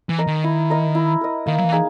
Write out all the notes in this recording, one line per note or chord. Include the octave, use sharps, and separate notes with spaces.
E3
A#4 D#5
D#3
E4
A#4 D#5
E4
A#4 D#5
D#3 A#3
F#3
E3
D#4 G#4